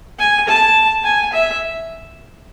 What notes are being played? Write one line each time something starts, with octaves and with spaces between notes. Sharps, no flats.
G#5
A5
G#5
E5